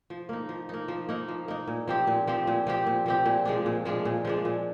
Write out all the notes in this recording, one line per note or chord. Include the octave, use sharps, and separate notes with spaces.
F3
A#3 D#4
F3
A#3 D#4
F3
A#3 D#4
F3
A#3 D#4
A#2
F3 C4 G4
A#2
F3 C4 G4
A#2
F3 C4 G4
A#2
F3 C4 G4
A#2
F3 G#3 D4
A#2
F3 G#3 D4
A#2
F3 G#3 D4
A#2